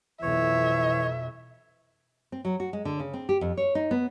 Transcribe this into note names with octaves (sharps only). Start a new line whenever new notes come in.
B1 F2 E3 C#5 E5
C4
F#3
F#4
G#3
D3
C#3
C4
G4
F2
C#5
D#4
B3